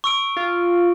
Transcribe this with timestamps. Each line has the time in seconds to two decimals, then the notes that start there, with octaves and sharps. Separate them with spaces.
0.04 C#6 E6 D7
0.37 F4